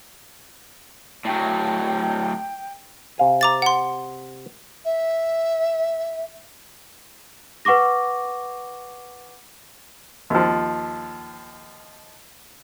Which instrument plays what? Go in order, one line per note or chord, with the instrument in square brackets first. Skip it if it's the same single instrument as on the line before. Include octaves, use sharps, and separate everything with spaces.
[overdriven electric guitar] A2 F#3 [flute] G5
[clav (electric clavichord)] C3 F5 G#5
[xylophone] A#5 D6 A6
F#5 C6
[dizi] E5
[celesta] B4 F#5 C#6 D6 A#6
[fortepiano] D#2 F3